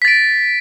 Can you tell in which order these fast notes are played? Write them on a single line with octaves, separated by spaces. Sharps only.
B6 A6 D7